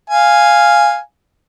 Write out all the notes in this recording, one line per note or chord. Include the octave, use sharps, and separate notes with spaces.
F5 G#5